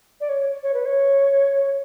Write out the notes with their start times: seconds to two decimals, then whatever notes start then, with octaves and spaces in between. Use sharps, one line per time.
0.21 D5
0.29 C#5
0.63 C#5
0.74 B4
0.85 C#5